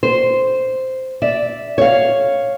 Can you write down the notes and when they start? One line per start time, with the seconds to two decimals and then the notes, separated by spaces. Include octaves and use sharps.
0.03 C5
1.22 D5 E5
1.78 C#5 F5